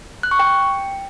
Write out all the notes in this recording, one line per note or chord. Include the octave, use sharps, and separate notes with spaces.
F#6
C#6
G5